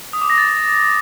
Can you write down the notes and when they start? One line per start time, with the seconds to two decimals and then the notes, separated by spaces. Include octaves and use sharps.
0.13 D#6
0.21 D6
0.30 A#6
0.38 A6